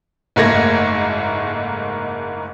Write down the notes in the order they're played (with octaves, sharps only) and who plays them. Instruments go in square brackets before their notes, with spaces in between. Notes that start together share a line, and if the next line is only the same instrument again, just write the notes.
[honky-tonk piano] F#1 G#2 A3 A#3 G#6 A#6